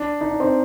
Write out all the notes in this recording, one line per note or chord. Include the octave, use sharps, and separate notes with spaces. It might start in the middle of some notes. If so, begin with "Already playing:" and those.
Already playing: D4
D#4
D4
C4 D#4